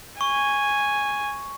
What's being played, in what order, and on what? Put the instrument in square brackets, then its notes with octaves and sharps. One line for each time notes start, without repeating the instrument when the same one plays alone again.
[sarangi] G#5 [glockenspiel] C#6